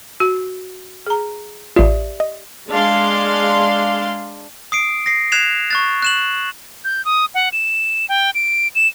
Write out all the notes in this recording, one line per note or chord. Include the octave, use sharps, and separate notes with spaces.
F#4
G#4 A#5
A1 F4 G4 D5 E5
D#5
G#3 D4 F5 C6
D#6 C7 D7
A#6 C7
F#6 G#6 C7 E7 F7
C#6 F#6 A6
F#6 E7 F#7
G6
D#6
F#5
E7
G5
D7
E7